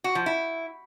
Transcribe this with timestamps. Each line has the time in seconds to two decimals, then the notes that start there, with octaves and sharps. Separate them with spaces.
0.04 F#4
0.15 F3
0.26 E4